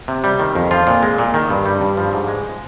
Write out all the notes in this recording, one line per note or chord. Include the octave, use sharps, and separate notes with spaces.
C3
G3
D#3
F2
F3 F4
A#2
G#3
A#2
D#3
G2
G3
G2
F3
G#2
G#3